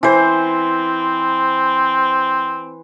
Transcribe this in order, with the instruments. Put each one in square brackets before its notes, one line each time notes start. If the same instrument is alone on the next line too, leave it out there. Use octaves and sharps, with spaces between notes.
[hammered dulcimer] E3 C5 [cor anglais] C4